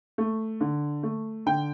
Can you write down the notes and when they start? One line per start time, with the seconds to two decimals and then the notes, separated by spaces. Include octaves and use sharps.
0.18 A3
0.61 D3
1.03 A3
1.46 D3 G5